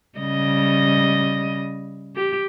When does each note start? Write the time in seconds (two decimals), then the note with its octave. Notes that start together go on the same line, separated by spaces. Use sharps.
0.19 C#3 G3 D#5
2.16 G4